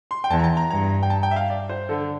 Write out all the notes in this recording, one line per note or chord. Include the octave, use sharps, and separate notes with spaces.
C6
G5
E2 A5
A#5
A5
A#5
G2 A#5
G5
A5
G5
E5
F5
D5
C5
D3 A4